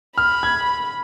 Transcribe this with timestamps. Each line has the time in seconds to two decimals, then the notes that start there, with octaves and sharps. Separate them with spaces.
0.17 B5 F6
0.43 G#6